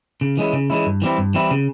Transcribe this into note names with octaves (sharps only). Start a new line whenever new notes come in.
C#3
E3 G#3 C#4 E4
C#3
E3 G#3 C#4 E4
G2
E3 G3 C4 E4
G2
E3 G3 C4 E4
C#3